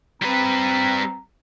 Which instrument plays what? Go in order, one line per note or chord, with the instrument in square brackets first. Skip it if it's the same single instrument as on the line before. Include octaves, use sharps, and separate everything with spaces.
[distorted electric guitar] G3 B4 [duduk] C4 [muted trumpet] A#5